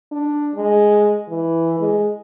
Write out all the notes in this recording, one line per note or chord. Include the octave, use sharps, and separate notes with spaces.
D4
G#3
E3
G#3